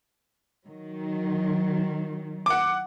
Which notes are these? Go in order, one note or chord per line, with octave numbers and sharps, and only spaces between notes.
D#3 F#3
F#5 D6